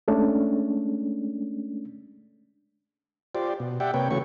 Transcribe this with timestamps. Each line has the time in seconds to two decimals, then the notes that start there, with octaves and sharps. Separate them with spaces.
0.08 G#3 A3 C#4 D4
3.35 F4 G4 C5 D5
3.60 B2
3.80 G4 D5 E5 F#5 G5
3.94 C3 A#3 B4 C#5 G5
4.10 C#3 E3 A3 F#4 C#5 C#6